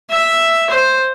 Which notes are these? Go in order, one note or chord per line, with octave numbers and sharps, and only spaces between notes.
E5
C5